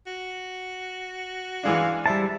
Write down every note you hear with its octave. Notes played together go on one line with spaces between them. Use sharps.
F#4
E3 G#3 D4 F5
G3 E4 C5 E5 A5